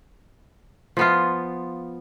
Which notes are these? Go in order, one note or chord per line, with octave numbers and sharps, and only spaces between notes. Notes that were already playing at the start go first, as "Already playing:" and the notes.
F3 B3 F4